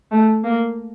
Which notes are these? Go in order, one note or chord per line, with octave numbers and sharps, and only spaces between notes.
A3
A#3